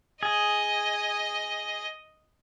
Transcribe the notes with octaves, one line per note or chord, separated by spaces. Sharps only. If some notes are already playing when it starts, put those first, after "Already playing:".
G#4 D#5